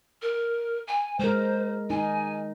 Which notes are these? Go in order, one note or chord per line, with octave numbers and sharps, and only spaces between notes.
A#4
G#5
G#3 A#4 C5
D#4 G#5